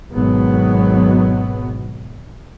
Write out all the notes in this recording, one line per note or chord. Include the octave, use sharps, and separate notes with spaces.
G#1 B2 F#3 B3